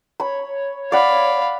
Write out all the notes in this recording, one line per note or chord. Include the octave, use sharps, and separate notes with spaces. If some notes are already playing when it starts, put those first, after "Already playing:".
C#5 B5
D5 F5 F#5 B5